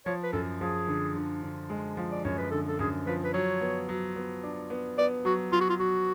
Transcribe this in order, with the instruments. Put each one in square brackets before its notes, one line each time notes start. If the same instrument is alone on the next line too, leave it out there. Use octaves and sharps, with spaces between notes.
[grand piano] F3 [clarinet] C#5
[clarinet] B4
[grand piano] F#2 [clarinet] A4
[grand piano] F3 [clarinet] G#4
[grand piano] D3
D3
D3
G#3
F3
[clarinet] D5
[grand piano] F#2 [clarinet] C#5
[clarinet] B4
[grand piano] D3 [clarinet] A4
[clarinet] A4
[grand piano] F#2 [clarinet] G#4
[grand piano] F3 [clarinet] B4
[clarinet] B4
[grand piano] F#3 [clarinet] C#5
[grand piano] B3
F#3
B3
D4
B3
[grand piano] B3 [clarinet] D5
[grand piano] F#3 [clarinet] F#4
[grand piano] F#3 [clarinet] F4
[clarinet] F#4
F4
[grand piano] F#3 [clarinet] F#4